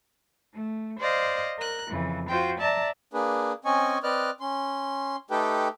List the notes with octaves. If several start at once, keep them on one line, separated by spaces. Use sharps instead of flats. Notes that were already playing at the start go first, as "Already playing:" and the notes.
A3
C5 D5 D#5 F5
A#4 F#6
F2 C#3 E3
F4 F#4 C5 G5
D5 E5 A5 A#5
A#3 D4 G#4 B4
C4 C#4 D#5 G#5 C#6
C4 B4 D5 D#5 F6 F#6
C#4 C6
A3 D#4 G4 A4 B4 G5